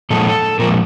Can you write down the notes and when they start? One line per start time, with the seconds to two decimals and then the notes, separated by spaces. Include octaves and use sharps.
0.10 A#2 F3 G#3 A4
0.59 A#2 F3 G#3 A#4